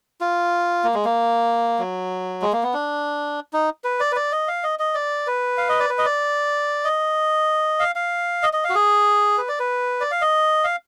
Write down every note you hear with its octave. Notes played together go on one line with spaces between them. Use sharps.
F4
A#3
G#3
A#3
F#3
G#3
A#3
B3
D4
D#4
B4
D5
B4
D5
D#5
F5
D#5
D#5
D5
B4
F5
D#5
D5
B4
D#5
D5
D#5
F5
F5
D#5
D#5
F5
F#4
G#4
B4
D5
B4
D5
F5
D#5
F5